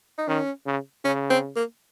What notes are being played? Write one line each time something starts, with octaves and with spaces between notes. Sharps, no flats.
D#4
D#3 C#4
C#3
C#3 C#4
C4
A#3